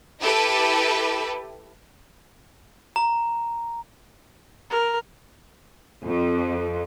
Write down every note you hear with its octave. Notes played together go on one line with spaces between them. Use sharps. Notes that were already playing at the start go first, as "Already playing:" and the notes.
E4 G4 A4 B4
A#5
A#4
F2